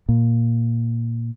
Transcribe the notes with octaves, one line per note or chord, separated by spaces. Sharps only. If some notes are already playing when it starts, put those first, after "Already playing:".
A#2